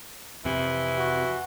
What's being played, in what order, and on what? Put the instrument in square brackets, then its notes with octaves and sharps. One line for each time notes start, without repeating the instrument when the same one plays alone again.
[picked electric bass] F2 C3 [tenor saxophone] E3
[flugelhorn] F#4